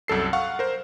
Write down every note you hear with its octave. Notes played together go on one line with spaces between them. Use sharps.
C2 F#2 A4 C7
F5 F#5 C#6
A#4 C5